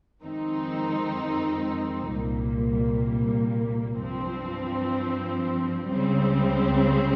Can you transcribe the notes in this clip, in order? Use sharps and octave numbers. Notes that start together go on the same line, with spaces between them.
F2 D#3 G#3 C4 D#4
C2 A#2 G3 A#3
G2 F3 C4
C#2 C#3 G3 C4